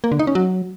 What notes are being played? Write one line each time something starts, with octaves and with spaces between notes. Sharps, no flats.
A#3
D3
D#4
C#4
F#3